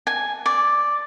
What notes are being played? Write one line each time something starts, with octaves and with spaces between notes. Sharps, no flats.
G#5
D5